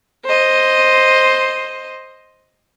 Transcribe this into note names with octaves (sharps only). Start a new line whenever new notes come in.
C5 D#5